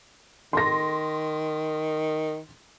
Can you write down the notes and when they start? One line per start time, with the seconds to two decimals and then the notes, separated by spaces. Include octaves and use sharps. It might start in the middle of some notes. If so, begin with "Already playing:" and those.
0.53 D#3 C6 A#6